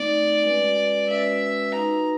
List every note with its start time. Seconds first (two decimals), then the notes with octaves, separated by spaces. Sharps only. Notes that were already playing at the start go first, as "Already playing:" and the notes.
Already playing: A3 C4 D#4 D5
0.43 G#3 C#4 F#4 B4
1.08 G#3 C#4 F#4 B4 E5
1.72 D#4 F#4 B4 A#5